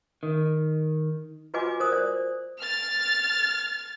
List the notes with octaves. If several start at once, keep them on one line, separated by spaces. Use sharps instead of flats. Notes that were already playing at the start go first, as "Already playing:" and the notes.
D#3
F4 F#4 B4 D#5 G#5 D6
A#4 C5 D#6
C5 D5
F6 A6